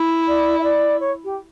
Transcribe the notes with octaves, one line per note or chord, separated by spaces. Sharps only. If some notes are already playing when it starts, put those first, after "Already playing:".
Already playing: E4
D5
E5
D5
C#5
G4